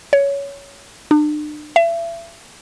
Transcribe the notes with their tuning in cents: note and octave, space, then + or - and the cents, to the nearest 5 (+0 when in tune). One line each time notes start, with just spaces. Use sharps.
C#5 +15
D4 +40
E5 +35